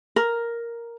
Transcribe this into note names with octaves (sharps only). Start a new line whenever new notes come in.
A#4